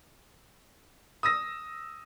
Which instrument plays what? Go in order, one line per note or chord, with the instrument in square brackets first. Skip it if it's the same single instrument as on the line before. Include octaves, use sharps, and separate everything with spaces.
[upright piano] D#6 E6 A#6